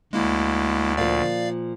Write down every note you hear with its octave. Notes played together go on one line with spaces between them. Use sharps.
D2 G#3 A#3 E4
A#2 F3 D5 F5